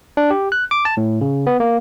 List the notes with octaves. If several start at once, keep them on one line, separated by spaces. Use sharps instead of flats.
D4
G4
F#6
D6
A5
A2
C#3
B3
A#3